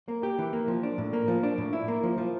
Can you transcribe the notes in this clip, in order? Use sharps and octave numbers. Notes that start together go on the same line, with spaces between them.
A#3
G4
E3
A#3
F3
D4
A2
A#3
F3
D4
A2
E4
A#3
F3
F3